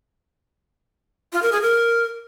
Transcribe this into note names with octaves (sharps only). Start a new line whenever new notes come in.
F4
A#4
G#4
A#4